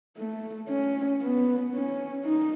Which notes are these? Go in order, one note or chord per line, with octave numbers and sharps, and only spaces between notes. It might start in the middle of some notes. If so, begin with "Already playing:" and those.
A3
C#4
B3
C#4
D#4